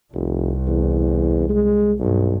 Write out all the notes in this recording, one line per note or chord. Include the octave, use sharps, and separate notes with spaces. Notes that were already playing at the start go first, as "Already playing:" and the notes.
F1 C2
E2
G#3
B1 G2